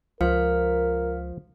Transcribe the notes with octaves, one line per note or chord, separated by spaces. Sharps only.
C#2 F3 A#4 F5 F6 C#7